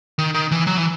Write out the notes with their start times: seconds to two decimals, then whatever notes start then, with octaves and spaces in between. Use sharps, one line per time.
0.18 D#3
0.34 D#3
0.51 E3
0.67 F#3
0.77 E3